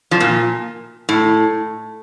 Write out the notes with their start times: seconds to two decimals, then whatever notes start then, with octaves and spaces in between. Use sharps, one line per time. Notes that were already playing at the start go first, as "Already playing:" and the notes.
0.11 F2 F3
0.20 A#2
1.09 A2